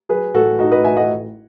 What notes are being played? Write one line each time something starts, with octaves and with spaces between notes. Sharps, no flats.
F#3 G#4 B4
A1 F#4 A4
A1 D#4 F#4
B4 D#5
A1 E5 G#5
D#5 F#5